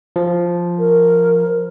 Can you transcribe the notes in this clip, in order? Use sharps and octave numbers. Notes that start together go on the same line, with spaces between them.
F3
A#4